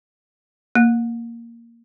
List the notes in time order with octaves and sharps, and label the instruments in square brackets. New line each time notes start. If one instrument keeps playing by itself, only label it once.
[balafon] A#3